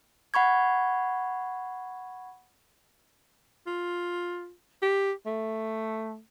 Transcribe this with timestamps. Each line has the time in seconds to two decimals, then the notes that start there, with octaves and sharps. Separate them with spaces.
0.34 F#5 B5 C#6 G#6
3.67 F4
4.82 G4
5.26 A3